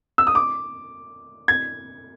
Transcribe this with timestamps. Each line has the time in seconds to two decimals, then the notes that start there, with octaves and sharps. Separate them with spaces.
0.18 E6
0.27 D#6
0.35 D6
1.48 G#6